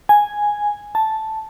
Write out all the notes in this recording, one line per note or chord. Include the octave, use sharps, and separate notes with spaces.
G#5
A5